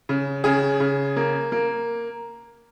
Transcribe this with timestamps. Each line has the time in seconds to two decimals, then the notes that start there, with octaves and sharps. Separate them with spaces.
0.09 C#3
0.44 C#3 G#4
0.80 C#3
1.16 A#3
1.52 A#3